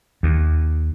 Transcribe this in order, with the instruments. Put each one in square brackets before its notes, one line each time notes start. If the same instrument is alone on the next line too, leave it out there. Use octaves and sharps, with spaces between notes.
[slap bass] D#2